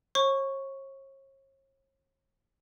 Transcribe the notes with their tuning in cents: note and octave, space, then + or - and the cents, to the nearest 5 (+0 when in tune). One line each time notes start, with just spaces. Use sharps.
C#5 -40 C#6 +0